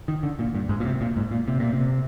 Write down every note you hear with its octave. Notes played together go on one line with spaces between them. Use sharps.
D#3
D3
A#2
G2
G#2
A#2
C3
A#2
G#2
A#2
C3
A#2
C3